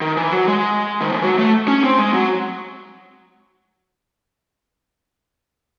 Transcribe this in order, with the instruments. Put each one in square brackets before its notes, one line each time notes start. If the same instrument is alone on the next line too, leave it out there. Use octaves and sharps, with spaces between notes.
[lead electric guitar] D#3
E3
F#3
G#3
D#3
E3
F#3
A3
C#4
C4
G#3
F#3